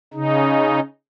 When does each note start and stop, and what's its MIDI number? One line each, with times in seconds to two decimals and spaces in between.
0.14 0.80 49
0.14 0.80 63